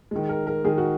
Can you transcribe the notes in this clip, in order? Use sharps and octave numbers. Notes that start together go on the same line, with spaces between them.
D#3 G#3
A#4
A#4
D#3 G#3 G#4
F#4